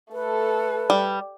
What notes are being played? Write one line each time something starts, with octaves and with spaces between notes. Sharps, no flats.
A3 A4 B4
G3